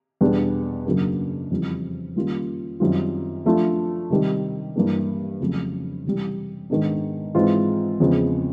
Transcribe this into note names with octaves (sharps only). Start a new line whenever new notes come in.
E2 B2 G3 B3 D4
F#2 C#3 F#3 A#3 D4
F2 C#3 E3 G3
D#3 G3 A#3 C#4 F4
F#2 D#3 G3 C4 F4
F3 A3 D4 F4
C3 D#3 G3
G2 E3 G3 A#3 D4
F2 C#3 F#3 A3
C3 E3 G3
G#2 D#3 G#3 B3 D4
G#2 E3 G#3 C4 F4
E2 C#3 F3 G#3 C4